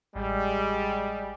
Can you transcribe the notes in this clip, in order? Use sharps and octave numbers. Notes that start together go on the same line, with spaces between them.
A1 G3 G#3